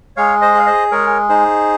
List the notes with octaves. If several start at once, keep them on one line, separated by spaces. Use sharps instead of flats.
G#3 C#5 F5
C5 D#5
G#4 F5
C5 D#5
G#3 A#4 C#5
D#4 G#4 C5